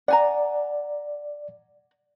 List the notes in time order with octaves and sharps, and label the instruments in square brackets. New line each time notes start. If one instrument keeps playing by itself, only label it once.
[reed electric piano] D5 [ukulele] F#5 G#5 A#5